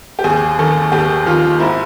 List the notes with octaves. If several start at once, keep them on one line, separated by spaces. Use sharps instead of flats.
G4
D#2 G#4
D#3 A4
D#2 G4
D#3 F4
G#2 E4